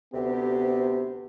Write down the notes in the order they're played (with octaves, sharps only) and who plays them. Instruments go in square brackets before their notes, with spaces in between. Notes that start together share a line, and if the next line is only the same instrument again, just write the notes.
[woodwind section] D2 C3 [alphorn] B3 [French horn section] G4